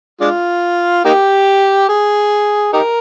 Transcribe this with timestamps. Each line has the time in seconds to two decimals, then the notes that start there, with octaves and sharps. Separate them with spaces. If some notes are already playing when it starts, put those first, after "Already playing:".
0.21 G#3 D4 F4
1.05 A#3 D#4 G4
1.89 G#4
2.73 D#4 G4 A#4